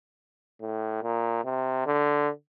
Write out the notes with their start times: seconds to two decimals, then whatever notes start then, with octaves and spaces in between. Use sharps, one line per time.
0.61 A2
1.02 A#2
1.44 C3
1.86 D3